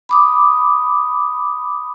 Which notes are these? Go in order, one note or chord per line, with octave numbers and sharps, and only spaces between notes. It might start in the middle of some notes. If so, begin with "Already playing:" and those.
B5 D6 D#6